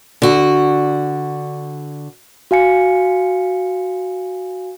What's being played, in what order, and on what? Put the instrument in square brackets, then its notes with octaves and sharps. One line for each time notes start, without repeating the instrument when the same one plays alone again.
[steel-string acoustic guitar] D3 F#4
[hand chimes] F#4 F5 G#5 C#7